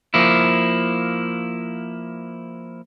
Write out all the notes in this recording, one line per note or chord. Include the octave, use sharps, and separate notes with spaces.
F3 A#3 E4